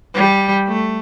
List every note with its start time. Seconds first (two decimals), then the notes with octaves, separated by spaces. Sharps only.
0.15 G3
0.68 A3